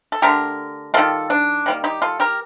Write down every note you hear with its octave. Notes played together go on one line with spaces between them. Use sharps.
A4
D3 A3 G4 A#4
D#3 G3 A#3 F4 A4
D4
D#3 G3 A#3
D#4 G4
F4 A4
G4 A#4